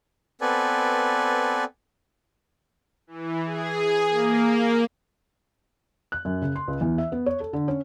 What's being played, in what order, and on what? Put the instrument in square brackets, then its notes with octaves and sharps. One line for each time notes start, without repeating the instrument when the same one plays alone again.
[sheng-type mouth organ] B3 C4 A4 B4 D5 G#5
[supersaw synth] E3
G#4
A#3
[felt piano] F#6
F#2
C#3
C6
C#2
E2
E5
B3
C#5
A4
D3
C#4